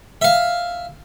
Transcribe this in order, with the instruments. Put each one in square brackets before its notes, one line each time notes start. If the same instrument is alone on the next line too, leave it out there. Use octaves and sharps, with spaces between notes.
[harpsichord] E5 F5